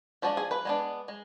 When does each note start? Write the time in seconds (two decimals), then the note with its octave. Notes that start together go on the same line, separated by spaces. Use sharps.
0.22 F3 G#3 D4 F#4
0.37 G#4
0.51 B4
0.65 G#3 B3 D4
1.08 G#3